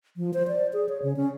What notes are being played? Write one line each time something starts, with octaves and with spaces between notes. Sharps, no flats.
F3
C5
D5
G#4
C#5
C#3
C#4